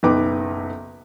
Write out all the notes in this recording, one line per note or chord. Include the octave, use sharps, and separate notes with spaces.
F#1 B1 D#4 B4 G5 D6